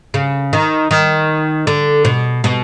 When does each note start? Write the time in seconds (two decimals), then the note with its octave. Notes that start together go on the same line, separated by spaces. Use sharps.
0.14 C#3
0.53 D#3
0.91 D#3
1.67 D3
2.05 B2
2.44 B2